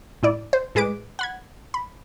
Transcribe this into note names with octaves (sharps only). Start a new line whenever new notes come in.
A2 E4 D5
C5
A2 G#3 G#4 B4 D6 D7
F#5 B5 G#6
B5